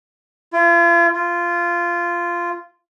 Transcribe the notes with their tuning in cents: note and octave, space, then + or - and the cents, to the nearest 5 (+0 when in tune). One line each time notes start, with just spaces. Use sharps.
F4 -40
F4 -15